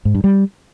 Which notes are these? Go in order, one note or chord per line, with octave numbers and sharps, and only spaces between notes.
G#2
G2
G3